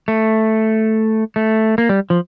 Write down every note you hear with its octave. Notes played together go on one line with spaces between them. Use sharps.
A3
A3
A#3
G3
F3